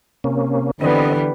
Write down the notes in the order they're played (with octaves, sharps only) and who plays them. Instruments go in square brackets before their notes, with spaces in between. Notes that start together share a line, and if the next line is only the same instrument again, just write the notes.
[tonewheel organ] C3 A#3 C#4
[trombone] D3 [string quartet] E3 G3 B3 [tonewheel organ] C4 D#5